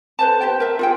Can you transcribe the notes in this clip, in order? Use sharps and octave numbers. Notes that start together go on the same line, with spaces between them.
A4 B4 C5 A5
G4 C5 G5
A#4 E5
F4 G#4 G5